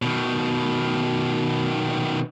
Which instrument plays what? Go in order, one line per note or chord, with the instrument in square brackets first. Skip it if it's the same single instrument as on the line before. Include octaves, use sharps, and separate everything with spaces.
[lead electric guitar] B2 D#3